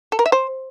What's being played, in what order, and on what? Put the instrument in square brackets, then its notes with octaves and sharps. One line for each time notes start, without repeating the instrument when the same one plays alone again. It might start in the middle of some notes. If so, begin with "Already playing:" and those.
[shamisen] A4
A#4
E5
C5